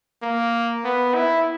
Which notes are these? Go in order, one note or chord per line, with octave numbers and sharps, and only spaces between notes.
A#3
B3
E4